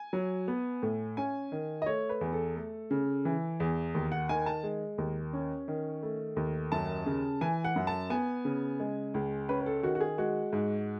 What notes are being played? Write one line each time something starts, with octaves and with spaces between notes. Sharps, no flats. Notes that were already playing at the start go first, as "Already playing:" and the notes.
Already playing: G#5
F#3
B3
A2
C#4 G#5
D#3
D#5
A3 C#5
B4
E2
A4
A3
C#3
E3
E2
D#2
F#5
D#3 G#5
A5
G#3
D#2
C#4
D#3
A3
D#2
F#2 A5
C#3
E3 G#5
F#5
F#2
A5
B3 G#5
C#3
G#3
C#2
C#4 B4
B4
A4
D#3 F#4
F#4
G#4
G#3 F#4
G#2